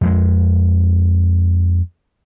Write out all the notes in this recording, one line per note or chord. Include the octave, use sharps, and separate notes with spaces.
F2 G#3